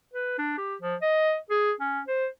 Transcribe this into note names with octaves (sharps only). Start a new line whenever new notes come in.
B4
D4
G4
F3
D#5
G#4
C#4
C5